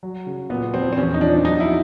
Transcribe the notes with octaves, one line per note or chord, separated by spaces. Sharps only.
F#3
C#3
A#2 B3
F3 C4
C4
E2 C#4
D#4
F3 D4
F#3 D#4
E4